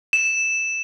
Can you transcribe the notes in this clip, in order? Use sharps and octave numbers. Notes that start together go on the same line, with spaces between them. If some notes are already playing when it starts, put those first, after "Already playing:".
E7